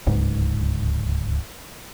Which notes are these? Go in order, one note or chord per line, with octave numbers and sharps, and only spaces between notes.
D1 C#2 G#2